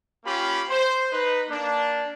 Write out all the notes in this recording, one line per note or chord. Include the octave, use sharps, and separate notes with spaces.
A#3 C#4 F4 G4 B5
C5
D#4 B4
A#3 D4